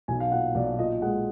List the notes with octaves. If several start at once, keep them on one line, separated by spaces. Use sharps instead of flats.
B1 G#5
F5
A#2 F#5
B1 D5
A#2 D#5
G#3 F#5